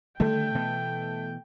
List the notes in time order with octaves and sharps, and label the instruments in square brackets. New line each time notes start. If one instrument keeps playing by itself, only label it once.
[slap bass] D3 D#3 G3 [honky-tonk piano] A3 [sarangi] G5
[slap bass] B2 E3 B3